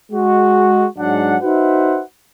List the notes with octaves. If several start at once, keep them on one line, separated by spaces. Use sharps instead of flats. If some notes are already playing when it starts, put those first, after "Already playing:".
G#3 F#4
G#2 F#3 D4 F#5
D#4 F#4 B4 C5 E5 F#5